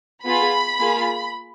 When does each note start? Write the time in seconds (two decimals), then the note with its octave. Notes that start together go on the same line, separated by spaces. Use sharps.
0.24 B3 F4 G#4 B5
0.80 A#3 F4 G#4